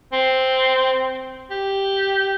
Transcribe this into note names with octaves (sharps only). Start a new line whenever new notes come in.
C4
G4